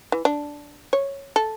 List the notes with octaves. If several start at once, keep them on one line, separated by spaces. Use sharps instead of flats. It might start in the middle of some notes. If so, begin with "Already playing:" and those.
E3
D4
C#5
A4